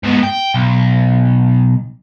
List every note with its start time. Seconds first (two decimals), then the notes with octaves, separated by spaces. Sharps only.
0.04 G#2 B2
0.23 G5
0.54 B1